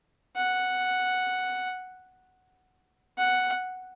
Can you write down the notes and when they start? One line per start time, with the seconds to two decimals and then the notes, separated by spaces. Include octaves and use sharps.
0.36 F#5
3.19 F#5